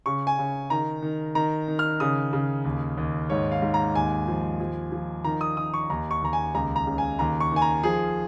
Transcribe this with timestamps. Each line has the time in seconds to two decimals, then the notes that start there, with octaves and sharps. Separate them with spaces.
0.06 C#3 C#6
0.27 G#5
0.39 C#3
0.70 D#3 A#5
1.02 D#3
1.35 D#3 A#5
1.68 D#3
1.79 F6
2.00 C#3 D#6
2.33 C#3
2.65 D#2
2.97 D#2
3.30 G#2 C#5
3.51 F5
3.62 G#2
3.74 A#5
3.95 D#2 G#5
4.28 F3
4.60 F3
4.92 F3
5.24 D#3 A#5
5.41 D#6
5.57 D#3 D#6
5.74 C#6
5.90 D#2 A#5
6.11 C#6
6.22 D#2 A#5
6.33 G#5
6.54 C#2 A#5
6.76 A#5
6.87 C#3
6.98 G#5
7.19 D#2 A#5
7.40 C#6
7.52 D#3 G#5
7.62 A#5
7.83 F3 G#4